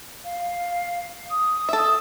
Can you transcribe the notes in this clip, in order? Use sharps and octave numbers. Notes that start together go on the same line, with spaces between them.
F5
D#6
A4 E5